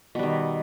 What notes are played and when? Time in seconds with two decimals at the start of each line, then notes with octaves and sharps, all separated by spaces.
0.15 B2
0.19 G3
0.23 D#3